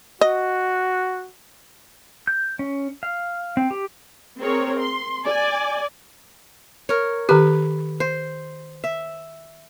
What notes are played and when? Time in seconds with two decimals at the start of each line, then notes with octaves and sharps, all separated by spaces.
0.21 F#4 D#5
2.27 G6
2.59 C#4
3.03 F5
3.57 C4
3.71 G4
4.39 C4 G#4 A#4 C#5
4.80 C6
5.26 D5 G#5
6.89 A#4 C#5
7.29 D#3 G4 B4
8.00 C5
8.84 E5